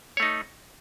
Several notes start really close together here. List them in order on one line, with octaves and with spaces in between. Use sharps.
C#5 A3 D#4